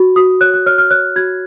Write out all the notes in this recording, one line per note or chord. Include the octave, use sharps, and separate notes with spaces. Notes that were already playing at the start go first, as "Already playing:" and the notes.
Already playing: F#4
F#4 D#6
C#5 F#6
F#6
C#5 F6
F6
C#5 F#6
F#4 G#6